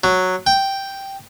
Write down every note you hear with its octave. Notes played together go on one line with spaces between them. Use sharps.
F#3
G5